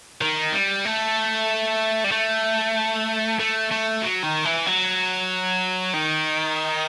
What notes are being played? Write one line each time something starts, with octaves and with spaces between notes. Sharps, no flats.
D#3
G3
A3
G3
A3
A3
A3
F#3
D#3
E3
F#3
D#3